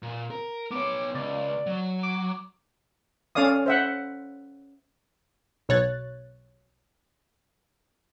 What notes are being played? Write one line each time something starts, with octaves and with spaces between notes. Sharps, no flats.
A#2
A#4
B3 C#5 D6
C#2 D5
F#3
D6
C#4 A4 D5 F5 D#6
C5 E5 F#5
B1 B2 C#5 F#6 A6